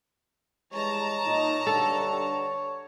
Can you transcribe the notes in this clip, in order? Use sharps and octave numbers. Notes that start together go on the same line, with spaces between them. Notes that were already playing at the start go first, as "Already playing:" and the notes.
E3 G3 G#3 C#5 A5 A#5
A#2 D#4
G2 D3 G3 A4